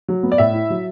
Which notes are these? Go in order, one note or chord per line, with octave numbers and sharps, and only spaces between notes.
F#3
B3
D5
A2 E5
E4
F#3